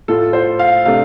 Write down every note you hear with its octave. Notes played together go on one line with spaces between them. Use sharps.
A2 A3 F4 A4
C5
F5
C3 A3 D4 F5